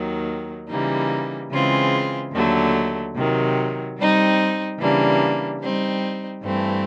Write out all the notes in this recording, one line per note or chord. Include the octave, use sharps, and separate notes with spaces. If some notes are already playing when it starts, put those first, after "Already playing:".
Already playing: D#2 D#3 F#3
C#3 E3 G3 A#3 D#4
C#3 E3 G#3 C4 F4
D#2 D3 F#3 A3
C3 D#3 F#3
G3 C4 D#4
C#3 E3 G3 A#3 D4
G3 C4 D#4
G2 E3 A3 C4